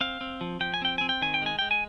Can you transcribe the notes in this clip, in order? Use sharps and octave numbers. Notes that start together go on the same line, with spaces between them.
C4 F5
C4
F3
F3 G5
G#5
C4 G5
C4 G#5
G5
D#3 G#5
G5
G#3 G#5
G#3 G5
G#5